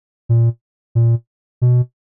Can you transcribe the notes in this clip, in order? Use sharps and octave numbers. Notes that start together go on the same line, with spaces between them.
A#2
A#2
B2